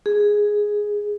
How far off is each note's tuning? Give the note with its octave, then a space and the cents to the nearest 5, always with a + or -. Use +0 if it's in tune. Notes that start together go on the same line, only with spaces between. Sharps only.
G#4 +0